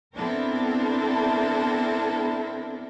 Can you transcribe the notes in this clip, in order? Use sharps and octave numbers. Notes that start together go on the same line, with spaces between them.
B3 C4 D4 E4 A4 A#4